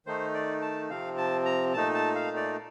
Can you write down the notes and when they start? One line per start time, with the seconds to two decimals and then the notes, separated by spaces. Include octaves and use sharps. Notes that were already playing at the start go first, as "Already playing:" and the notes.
0.06 D#3 A3 D#4 C5
0.34 D5
0.62 A5
0.89 C3 F3 C4 F5
1.17 A5
1.45 A#5
1.73 A#2 A3 D#4 A5
1.95 A5
2.15 F5
2.37 D5